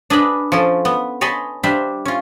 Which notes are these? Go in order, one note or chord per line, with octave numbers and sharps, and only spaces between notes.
D4 G#4 B4 D#5 B5
F3 C#4 A4
B3
C#5 D#5 G#5 A5 B5 C6
G3 D4 C5 E5
C#4 F4